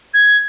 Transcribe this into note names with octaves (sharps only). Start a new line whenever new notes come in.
G#6